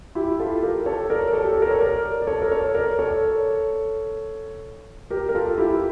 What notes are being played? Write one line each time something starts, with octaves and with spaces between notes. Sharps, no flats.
E4 G4
F4 A4
G4 A#4
A4 C#5
A#4 D5
A4 C#5
G4
A4
A#4
C#5
A#4 D5
D5
A4 C#5
A#4
A4 C#5
A#4 D5
A4 C#5
G4 A#4
A#4
F4 A4
E4 G4